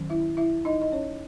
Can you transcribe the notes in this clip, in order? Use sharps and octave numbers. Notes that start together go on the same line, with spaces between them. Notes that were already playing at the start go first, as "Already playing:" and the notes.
Already playing: D#3 F#3 C#4
E4 E5
E4 E5
D#4 D#5
D#5
C#4 C#5